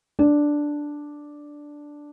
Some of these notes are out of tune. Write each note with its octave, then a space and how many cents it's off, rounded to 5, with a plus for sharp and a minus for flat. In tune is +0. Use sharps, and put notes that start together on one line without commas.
D4 +0